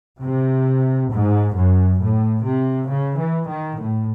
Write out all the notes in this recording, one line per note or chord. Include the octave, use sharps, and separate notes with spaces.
C3
G#2
F#2
A2
C3
C#3
E3
D#3
A2